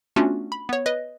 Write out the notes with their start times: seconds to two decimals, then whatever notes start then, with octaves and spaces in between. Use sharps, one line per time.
0.16 A3 B3 C#4 D4 F4 F#4
0.52 B5
0.69 B3 C#5
0.86 B4 D#5